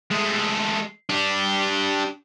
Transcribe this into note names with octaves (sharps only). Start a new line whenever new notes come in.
G#3 A3
D4 G4